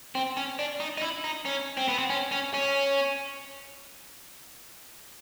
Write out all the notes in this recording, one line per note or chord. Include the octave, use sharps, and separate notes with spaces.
C4
C#4
D4
D#4
D#4
E4
D#4
C#4
C4
B3
C4
C#4
C#4
C#4